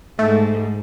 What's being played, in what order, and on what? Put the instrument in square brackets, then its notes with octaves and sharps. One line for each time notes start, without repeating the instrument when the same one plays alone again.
[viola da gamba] G#2 [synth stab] A3